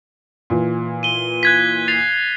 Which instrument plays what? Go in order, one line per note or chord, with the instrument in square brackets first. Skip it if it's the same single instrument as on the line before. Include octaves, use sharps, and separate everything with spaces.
[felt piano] A#2 E3
[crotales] D#7 G7
F#6 G#6 B6
A6 C7 F7